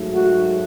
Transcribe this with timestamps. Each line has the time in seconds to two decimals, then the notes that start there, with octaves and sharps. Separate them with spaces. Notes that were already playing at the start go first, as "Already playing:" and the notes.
Already playing: G#2 F#3 A3
0.13 F#4